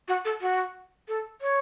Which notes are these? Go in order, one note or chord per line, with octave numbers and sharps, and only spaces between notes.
F#4
A4
F#4
A4
C#5